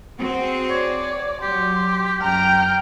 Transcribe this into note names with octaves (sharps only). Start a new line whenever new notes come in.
C4 F#4 G#4
C#5 D5
F#3 G4 C6
F#2 G5 A#5 F6